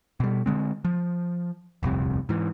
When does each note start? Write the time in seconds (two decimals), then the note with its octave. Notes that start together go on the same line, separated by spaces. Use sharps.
0.20 B2 G3
0.46 D3 G#3 C4
0.85 F3
1.83 D#1 C2 F2 C3
2.29 G#2 E3